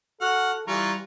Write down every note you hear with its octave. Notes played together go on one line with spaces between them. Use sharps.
F#4 A4 F#5 F6
E3 G3 F4 A#5 C#6